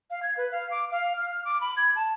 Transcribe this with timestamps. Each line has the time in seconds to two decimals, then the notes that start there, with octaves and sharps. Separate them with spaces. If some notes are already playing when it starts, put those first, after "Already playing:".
0.10 F5
0.23 G#6
0.37 B4
0.51 F5
0.71 D6
0.91 F5
1.17 F6
1.45 D6
1.61 B5
1.77 G#6
1.96 A5